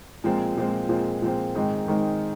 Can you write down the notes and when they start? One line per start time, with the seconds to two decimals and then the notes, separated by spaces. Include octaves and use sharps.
0.24 A#2 F3 G#3 C4
0.57 A#2 F3 G#3 C4
0.89 A#2 F3 G#3 C4
1.22 A#2 F3 G#3 C4
1.55 G#2 D#3 G#3 C4 D#4
1.88 G#2 D#3 G#3 C4 D#4